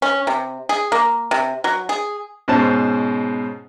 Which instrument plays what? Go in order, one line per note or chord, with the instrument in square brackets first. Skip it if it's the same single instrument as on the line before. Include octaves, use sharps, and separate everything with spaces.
[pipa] C#4
C3
G#4
A#3
C3
F#3
G#4
[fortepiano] G#2 B2 C#4 C5 A5